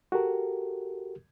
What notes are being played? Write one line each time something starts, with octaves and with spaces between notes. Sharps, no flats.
F#4 G4 A4 A#4